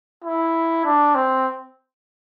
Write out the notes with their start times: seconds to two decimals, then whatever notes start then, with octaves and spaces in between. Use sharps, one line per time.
0.24 E4
0.85 D4
1.15 C4